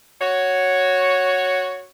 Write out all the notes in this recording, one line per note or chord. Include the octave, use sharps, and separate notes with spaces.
F#4 C#5